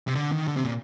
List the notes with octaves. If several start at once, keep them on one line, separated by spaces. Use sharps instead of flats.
C3
D3
D#3
D3
C3
A#2